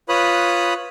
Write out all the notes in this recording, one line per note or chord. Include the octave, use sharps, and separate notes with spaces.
F4 B4 C#5 B5 D#6 F#6